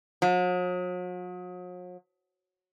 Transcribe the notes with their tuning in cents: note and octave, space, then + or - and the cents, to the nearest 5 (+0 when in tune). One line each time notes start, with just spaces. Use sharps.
F#3 -45